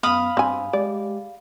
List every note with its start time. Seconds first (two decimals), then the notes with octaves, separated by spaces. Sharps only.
0.03 F#2 B3 F5 B5 D#6
0.37 G2 C4 G#5
0.73 G#3 G4 D5